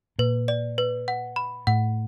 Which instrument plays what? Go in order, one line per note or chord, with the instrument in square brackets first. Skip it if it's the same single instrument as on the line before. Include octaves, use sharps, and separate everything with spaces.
[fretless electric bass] A#2 [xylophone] B4
[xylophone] D5
B4
F#5
B5
[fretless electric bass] A2 [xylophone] F#5